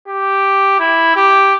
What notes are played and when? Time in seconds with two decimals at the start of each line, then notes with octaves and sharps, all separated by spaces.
0.08 G4
0.80 E4
1.16 G4